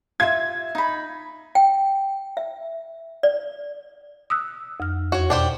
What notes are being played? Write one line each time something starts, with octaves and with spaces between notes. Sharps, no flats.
F4 E5 G#6
D#4 B5
G5
E5
D5
D#6 E6 F#6
F2 F6
E2 F#4 C#5
B2 D4 G4 C5